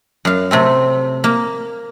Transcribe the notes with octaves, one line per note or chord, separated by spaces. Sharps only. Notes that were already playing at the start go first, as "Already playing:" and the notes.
F#2 F5
C3 A3 C4
A#3